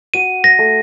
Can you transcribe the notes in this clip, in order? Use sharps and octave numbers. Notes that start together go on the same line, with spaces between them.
F#4 D#7
A#6
A3